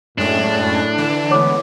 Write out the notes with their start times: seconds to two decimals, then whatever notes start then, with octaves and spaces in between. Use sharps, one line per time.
0.18 F#2 A2 G#3 C#4 D4
0.98 D3 E3
1.31 G#3 A3 B3 C#5 D6